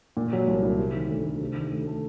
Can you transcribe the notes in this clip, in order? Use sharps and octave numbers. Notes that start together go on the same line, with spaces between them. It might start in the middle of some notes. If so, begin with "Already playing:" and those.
A#2
F#3
C2
C2
C3
D#3
D2
D2
C3
D#3
D2
A3